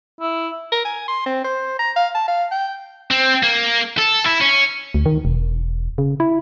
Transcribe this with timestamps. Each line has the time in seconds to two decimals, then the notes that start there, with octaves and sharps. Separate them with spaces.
0.21 E4
0.72 A#4
0.85 G#5
1.08 C6
1.26 C4
1.44 C5
1.79 A#5
1.96 F5
2.14 A5
2.28 F5
2.51 G5
3.11 C4
3.43 A#3
3.98 A4
4.26 E4
4.41 C#4
4.94 D2
5.06 D#3
5.25 E1
5.98 C#3
6.20 E4